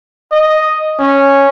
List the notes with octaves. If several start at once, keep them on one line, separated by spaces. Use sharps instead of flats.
D#5
C#4